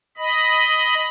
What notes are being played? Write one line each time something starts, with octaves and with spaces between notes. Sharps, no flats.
D#5 B5